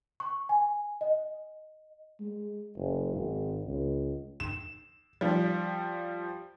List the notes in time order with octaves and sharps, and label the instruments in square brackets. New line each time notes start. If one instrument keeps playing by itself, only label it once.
[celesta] C#6
G#5
D#5
[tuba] G#3
F#1
G#1
C#2
[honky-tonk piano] E7
F3 G3